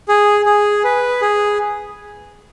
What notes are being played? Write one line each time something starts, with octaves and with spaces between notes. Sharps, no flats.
G#4
G#4
B4
G#4